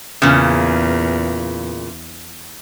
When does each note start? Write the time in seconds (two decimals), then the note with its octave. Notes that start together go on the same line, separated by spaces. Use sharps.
0.22 E2 A#2 C#3